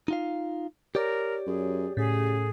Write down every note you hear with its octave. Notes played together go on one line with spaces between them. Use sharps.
D#4 F4 F5
G4 A#4 C#5 D5
F#2 G#4
A2 C#3 G#4